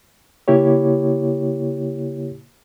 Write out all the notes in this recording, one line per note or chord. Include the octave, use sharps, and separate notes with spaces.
C#3 A#3 E4 G4 C#5